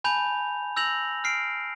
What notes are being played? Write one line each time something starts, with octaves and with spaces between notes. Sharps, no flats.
G#5 A5 B5 G6 F7
E6 G6 A#6 F7 F#7
F6 C7 D7